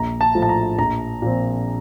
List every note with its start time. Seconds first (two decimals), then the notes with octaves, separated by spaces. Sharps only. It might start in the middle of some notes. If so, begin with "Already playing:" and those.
Already playing: A#1 A#5
0.21 A5
0.35 A2 F3
0.42 A5
0.49 A#5
0.78 A#1 A#5
1.22 A#2 F3 C4